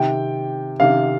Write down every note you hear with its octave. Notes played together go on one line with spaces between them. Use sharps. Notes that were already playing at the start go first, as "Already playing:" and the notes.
Already playing: C3 D#3 G5
C3 D#3 F5